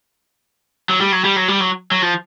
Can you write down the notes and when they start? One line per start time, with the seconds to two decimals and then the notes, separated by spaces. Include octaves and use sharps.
0.89 F#3
1.01 G3
1.12 F#3
1.25 G3
1.36 F#3
1.48 G3
1.60 F#3
1.91 F#3
2.02 F3